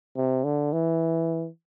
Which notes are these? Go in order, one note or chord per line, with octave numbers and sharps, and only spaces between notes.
C3
D3
E3